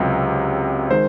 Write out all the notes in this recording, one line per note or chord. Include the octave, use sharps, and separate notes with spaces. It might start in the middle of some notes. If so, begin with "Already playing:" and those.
Already playing: C#2 C3 F#3
D#3 G#3 C5